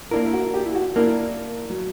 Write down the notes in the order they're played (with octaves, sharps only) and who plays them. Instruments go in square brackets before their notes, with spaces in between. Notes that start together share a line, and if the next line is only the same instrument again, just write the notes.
[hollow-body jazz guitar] A#3 D4 A#4 [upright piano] E4
[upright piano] E4
F#4
G4
E4
F#4
[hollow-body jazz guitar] A#3 D4 A#4 [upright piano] E4
[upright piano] F#3